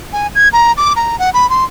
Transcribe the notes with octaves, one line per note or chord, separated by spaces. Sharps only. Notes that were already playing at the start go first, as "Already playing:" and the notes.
G#5
G#6
A#5
D6
A#5
F#5
B5
C6